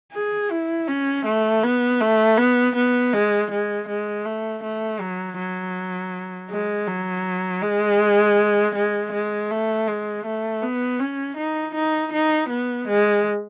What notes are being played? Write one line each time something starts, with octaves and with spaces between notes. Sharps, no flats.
G#4
E4
C#4
A3
B3
A3
B3
B3
G#3
G#3
G#3
A3
A3
F#3
F#3
G#3
F#3
G#3
G#3
G#3
A3
G#3
A3
B3
C#4
D#4
D#4
D#4
B3
G#3